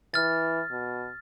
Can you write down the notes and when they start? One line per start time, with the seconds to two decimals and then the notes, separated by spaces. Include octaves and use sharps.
0.14 E3 F6 A6
0.71 B2